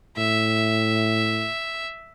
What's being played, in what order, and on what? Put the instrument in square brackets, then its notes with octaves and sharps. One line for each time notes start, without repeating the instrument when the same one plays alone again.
[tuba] A2 [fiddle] E5